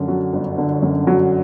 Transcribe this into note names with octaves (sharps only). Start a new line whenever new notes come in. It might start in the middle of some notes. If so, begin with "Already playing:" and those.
Already playing: F#2 D3
F#3
G1
D3
F#2
F#3